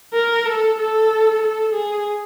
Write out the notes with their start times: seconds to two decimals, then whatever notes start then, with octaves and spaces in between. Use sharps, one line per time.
0.14 A#4
0.46 A4
0.78 A4
1.42 A4
1.74 G#4